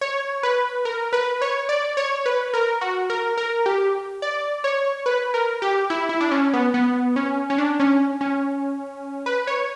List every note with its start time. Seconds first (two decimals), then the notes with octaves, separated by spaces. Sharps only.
0.01 C#5
0.43 B4
0.85 A#4
1.13 B4
1.42 C#5
1.69 D5
1.97 C#5
2.26 B4
2.54 A#4
2.81 F#4
3.10 A#4
3.37 A#4
3.66 G4
4.22 D5
4.64 C#5
5.06 B4
5.34 A#4
5.62 G4
5.90 E4
6.09 E4
6.21 D4
6.31 C#4
6.53 B3
6.74 B3
7.16 C#4
7.50 C#4
7.58 D4
7.80 C#4
8.21 C#4
9.26 B4
9.47 C#5